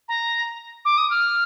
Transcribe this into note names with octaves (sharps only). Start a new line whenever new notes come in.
A#5
D6
D#6
F6